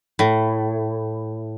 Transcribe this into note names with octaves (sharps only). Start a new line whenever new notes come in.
A2